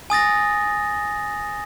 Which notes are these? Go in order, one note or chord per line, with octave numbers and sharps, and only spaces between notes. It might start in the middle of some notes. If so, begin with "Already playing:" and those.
G#5 D#6 A6 A#6